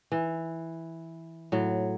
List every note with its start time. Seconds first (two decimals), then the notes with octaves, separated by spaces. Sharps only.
0.12 E3
1.52 A2 F#3